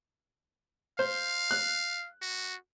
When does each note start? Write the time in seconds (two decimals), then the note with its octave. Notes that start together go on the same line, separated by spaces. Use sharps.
0.99 C5 F5
1.51 F#6
2.22 F#4